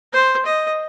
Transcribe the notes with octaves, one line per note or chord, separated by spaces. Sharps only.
C5
D#5